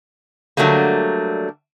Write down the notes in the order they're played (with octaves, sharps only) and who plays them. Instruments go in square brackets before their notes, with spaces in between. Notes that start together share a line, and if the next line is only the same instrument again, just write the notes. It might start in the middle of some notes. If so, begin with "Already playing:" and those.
[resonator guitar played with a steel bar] D3 F#3 G3 A3 A#3